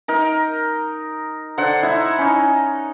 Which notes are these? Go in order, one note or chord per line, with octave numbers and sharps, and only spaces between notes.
D#4 A#4
D3 C5 F#5
D#4 E4
C#4 D#4